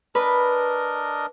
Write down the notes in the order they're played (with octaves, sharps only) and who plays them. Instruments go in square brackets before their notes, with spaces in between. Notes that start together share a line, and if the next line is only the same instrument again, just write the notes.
[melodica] D4 A#4 D#5 [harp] B4